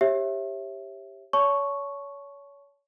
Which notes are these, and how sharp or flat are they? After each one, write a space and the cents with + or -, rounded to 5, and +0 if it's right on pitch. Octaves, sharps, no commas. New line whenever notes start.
G4 +5 C#5 -30 E5 +0
C#5 +30 A5 -20 C#6 +0